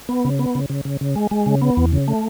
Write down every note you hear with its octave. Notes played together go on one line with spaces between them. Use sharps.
B3
C#3
B3
C#3
C#3
C#3
C#3
G#3
G#3
C#3
B3
E2
C#3
A3